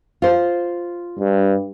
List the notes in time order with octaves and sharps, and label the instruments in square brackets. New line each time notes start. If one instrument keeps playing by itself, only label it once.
[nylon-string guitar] F4 C5
[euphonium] G2